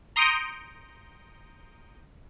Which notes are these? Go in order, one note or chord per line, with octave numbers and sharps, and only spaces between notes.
A#5 C6 D#6 G6 C#7 D7